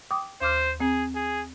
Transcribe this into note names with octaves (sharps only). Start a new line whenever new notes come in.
G5 D6 D#6
D#2 C5 D6 F6
C4 G#4
G#4